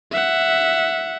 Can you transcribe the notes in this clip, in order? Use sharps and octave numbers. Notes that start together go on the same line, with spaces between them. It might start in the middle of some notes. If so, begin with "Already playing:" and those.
E5 F#5